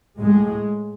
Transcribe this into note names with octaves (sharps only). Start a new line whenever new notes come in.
A2 G#3